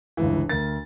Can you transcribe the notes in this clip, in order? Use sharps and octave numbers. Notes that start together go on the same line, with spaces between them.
G1 C#2 E3
D2 A#4 A6